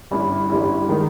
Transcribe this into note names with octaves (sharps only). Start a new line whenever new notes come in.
G1 G2 G3 C#4 E4
G1 G2 G3 C#4 E4
D#3 G#3 D#4